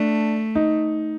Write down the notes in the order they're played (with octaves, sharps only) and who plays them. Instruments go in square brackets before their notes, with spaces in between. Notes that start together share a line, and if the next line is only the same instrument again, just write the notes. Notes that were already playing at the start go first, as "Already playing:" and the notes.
Already playing: [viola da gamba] A3 [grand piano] D4
[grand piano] D#4